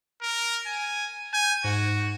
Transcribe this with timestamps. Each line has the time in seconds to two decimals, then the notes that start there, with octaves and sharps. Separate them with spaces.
0.22 A#4
0.66 G#5
1.33 G#5 G6
1.64 G#2 F#4